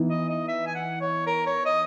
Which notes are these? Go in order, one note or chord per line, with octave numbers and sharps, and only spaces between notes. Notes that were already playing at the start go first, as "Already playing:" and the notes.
Already playing: E3 B3 D#4
D#5
D#5
E5
G#5
F#5
C#5
A#4
C#5
D#5